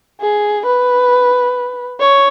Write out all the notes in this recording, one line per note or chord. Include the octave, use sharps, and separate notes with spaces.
G#4
B4
C#5